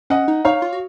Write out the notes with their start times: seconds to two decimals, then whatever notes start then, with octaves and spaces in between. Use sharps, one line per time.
0.10 C#4 D#5 F#5
0.28 D#4
0.45 D#4 C#5 F5
0.62 F4
0.73 F#4